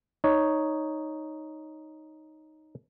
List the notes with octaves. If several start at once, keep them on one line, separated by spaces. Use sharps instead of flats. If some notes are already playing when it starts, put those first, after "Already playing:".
D#4 C#5